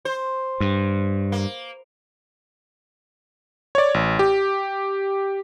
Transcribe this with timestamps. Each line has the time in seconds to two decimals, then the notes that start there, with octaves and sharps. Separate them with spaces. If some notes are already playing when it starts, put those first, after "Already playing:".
0.05 C5
0.60 G2
1.32 A#3
3.75 C#5 D5
3.94 A1
4.19 G4